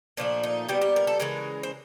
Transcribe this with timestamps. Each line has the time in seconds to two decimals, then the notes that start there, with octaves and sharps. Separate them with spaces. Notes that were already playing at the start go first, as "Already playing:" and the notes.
0.17 A#2 F3 A3 D4
0.43 D#4
0.69 A#2 G3 B3 G4
0.81 G4
0.96 A#4
1.07 A4
1.20 C#3 E3 G#3 A#4
1.63 C5